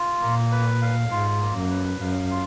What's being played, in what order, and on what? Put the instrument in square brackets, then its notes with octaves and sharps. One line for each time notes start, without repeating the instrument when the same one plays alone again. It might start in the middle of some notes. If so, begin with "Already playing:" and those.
Already playing: [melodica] F4
[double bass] A#2 [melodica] A#3
[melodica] B4
F5
[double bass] G#2 [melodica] F4
[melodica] A#3
[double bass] F#2
[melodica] B4
[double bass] F#2 [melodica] F5
[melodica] F4